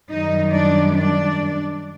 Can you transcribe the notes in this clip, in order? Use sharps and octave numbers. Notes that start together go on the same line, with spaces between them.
F#2 D#3 G3 D#4 D#5
D4 D5
D4 D5